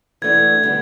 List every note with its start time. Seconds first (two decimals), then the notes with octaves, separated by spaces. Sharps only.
0.22 E3 A3 D4 F#4 G#6
0.63 D3 G3 B3